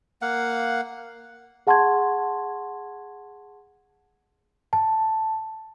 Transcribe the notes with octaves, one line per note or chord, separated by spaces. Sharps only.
A#3 F5 F#5
G#4 F#5 A5 C6 C#6 G#6
A5